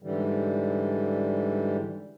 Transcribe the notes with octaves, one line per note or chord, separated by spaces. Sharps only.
G#2 D3 E3 G3